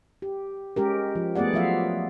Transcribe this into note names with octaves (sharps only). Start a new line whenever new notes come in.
G4
G#3 C#4 G4 A#4
F3
A3 B3 G#4 D5 F#5
F3 F#3 F4 E5 F5